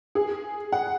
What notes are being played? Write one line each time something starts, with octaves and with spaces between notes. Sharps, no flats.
G#4
F#5